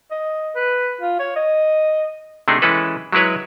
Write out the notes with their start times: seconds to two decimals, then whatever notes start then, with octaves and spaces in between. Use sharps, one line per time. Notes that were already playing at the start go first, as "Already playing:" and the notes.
0.11 D#5
0.56 B4
1.01 F4
1.19 C#5
1.36 D#5
2.48 C3 A3 D4 D#4 G#4
2.62 E3 G#3 C#4 E4 A4 B4
3.12 F#3 G#3 E4 B4 C#5